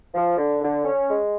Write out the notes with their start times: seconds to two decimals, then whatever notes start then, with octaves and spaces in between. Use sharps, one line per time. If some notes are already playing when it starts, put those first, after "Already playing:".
0.14 F3
0.36 D3
0.60 D3
0.84 C#4
1.07 G#3